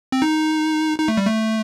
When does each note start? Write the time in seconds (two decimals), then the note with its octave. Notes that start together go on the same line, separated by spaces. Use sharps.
0.12 C4
0.22 D#4
0.98 D#4
1.08 A3
1.17 G3
1.27 A3